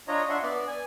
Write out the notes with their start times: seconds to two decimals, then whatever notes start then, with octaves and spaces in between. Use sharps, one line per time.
0.08 D4 F4 C#5 D#5 A#5
0.29 D4 E5 F#5 C6
0.43 B3 D5
0.67 G#5